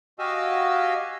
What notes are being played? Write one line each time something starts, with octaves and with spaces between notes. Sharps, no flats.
F#4 G4 D#5 F5 G#5 E6